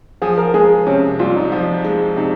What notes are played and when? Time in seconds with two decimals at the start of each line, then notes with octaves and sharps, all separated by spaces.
0.22 F3 G#4
0.38 A#4
0.54 G#3 G#4
0.87 C3 C#4
1.19 C2 F4
1.36 D#4
1.52 F3
1.85 G#3
2.16 C3 D#4